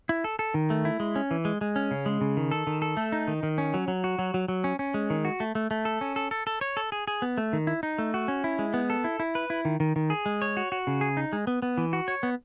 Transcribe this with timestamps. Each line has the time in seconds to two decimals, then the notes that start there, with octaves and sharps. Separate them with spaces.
0.09 E4
0.24 A4
0.39 A4
0.54 D#3
0.70 A3
0.85 E4
1.00 G#3
1.16 C#4
1.31 E3
1.45 G#3
1.61 G#3
1.76 C#4
1.91 C#3
2.06 G#3
2.21 C#3
2.37 D#3
2.51 A4
2.67 D#3
2.82 A4
2.97 A3
3.12 D#4
3.28 D#3
3.43 D#3
3.58 C#4
3.74 F#3
3.88 F#3
4.04 F#4
4.19 F#3
4.34 F#3
4.48 F#3
4.64 C#4
4.79 C#4
4.94 G#3
5.10 D#3
5.25 F#4
5.40 A3
5.55 A3
5.71 A3
5.85 A4
6.01 C#4
6.16 A4
6.31 A4
6.47 A4
6.61 C#5
6.77 A4
6.92 G#4
7.08 G#4
7.22 B3
7.38 A3
7.53 D#3
7.67 E4
7.83 D#4
7.98 A3
8.14 F#4
8.28 C#4
8.44 E4
8.59 G#3
8.74 B3
8.90 A4
9.04 E4
9.20 E4
9.35 B4
9.50 E4
9.65 D#3
9.80 D#3
9.96 D#3
10.10 G#4
10.26 G#3
10.42 C#5
10.57 F#4
10.72 F#4
10.87 C#3
11.01 G#4
11.17 D#4
11.33 G#3
11.47 B3
11.62 B3
11.78 E3
11.93 F#4
12.08 C#5
12.23 B3